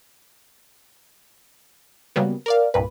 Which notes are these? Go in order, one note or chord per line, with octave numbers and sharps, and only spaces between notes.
C#3 F#3 G3 A#3 B3
A#4 D5 F5
C2 G2 A#2 B4